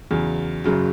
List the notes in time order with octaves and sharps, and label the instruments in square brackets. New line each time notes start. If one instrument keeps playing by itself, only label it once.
[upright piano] E2 C#3 F#3
F#1 F#2 C#3 F#3